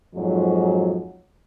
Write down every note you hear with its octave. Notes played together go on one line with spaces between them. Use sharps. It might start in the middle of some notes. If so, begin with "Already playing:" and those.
F2 G#2 F3 F#3